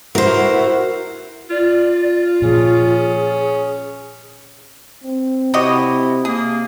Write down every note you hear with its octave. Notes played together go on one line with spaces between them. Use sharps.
E4 F#4 A#4 C5
F4 D5
A#2 F3 C#4 G#4
C4
C3 E4 F#4 G4 D#5
A#3 G#4